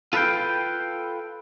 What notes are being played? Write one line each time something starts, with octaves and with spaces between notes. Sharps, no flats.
F4 A4 B4 E5 F5 G5